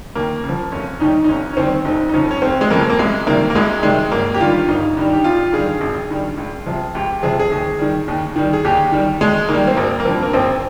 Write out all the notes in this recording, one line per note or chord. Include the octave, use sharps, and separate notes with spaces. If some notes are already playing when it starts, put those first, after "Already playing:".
D#2 A#3
C#3
F3
F1 C#4
D#2 D#3 G3 D#4
D#4
F1 C#4
C#4
D#2 D#3 G3 C4
F1 D#4
D#4
F2 C#3 F3 C#4
C#4
F1 C4
G#3
F2 C#3 F3 A#3
A#3
C2 G#3
C3 D#3 G3 A#3
A#3
C2 G#3
C3 D#3 G3 G#3
G1 A#3
G4
G2 D#3 G3 F4
G1 D#4
G2 D#3 G3
G4
G#1 F4
G2 D#3 G3 G#4
G#1
G2 D#3 G3
C#2
C3 F3
C#2 G4
C3 F3 G#4
G#4
D#2
D#3 G3
D#2
D#3 G3
G#4
D#2 G4
D#3 G3
D#2 G#3
D#3 G3 A#3
C4
G#1 A#3
A#3
G2 F3 C4
A#3
G#1 C4